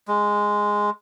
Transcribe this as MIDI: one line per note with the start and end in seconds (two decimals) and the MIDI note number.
0.08 0.90 56